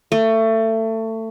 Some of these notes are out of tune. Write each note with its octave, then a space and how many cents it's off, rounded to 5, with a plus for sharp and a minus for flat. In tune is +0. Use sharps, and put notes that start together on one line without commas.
A3 +25